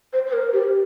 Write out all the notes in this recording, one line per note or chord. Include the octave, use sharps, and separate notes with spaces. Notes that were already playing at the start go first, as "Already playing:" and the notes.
C5
C5
A#4
G4